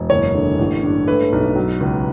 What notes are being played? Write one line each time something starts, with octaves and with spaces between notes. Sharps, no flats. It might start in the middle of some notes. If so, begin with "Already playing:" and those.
Already playing: E1
F#1 C#5
D3
A1
G2
A3 B4
B1
F#3
C#2